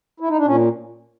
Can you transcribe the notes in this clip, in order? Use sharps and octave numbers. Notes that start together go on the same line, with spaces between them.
E4
D#4
D4
A#2 C#4